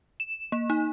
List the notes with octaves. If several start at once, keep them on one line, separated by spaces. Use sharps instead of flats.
E7
A#3
D#4